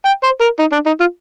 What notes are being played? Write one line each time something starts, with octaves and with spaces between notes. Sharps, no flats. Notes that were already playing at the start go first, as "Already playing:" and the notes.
G5
C5
A#4
D#4
D4
D#4
F4